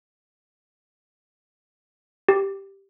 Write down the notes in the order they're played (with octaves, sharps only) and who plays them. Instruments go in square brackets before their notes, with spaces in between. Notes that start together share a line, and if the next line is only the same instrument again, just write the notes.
[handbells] G4